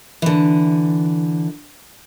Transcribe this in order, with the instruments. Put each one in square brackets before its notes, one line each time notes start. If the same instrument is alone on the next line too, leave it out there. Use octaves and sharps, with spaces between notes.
[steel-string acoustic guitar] D3 E3